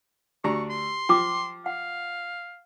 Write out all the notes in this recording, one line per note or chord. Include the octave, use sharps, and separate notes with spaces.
D2 D4 G4 A#5 C#6
C6
F3 G5 D6
F5 F#5